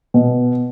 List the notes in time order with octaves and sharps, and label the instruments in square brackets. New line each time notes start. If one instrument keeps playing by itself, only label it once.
[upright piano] B2